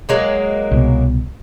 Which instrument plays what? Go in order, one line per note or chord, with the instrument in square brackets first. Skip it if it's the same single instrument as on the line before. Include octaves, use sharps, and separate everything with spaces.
[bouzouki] F#3 G#3 A#3
[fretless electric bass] C2 B2